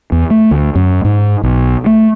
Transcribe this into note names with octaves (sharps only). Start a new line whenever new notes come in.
E2
A3
D2
F#2
G#2
B1
A3